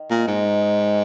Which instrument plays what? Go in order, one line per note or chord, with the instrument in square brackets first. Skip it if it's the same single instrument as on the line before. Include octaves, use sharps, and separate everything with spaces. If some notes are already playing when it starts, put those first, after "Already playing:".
Already playing: [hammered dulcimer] D#3
[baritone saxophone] A#2 [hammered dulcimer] G#3
[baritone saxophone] G#2 [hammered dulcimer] D#4
[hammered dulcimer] D#4
D#4
D#3